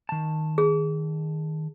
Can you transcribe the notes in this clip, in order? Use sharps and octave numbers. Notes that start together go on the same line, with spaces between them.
D#3 A5
G#4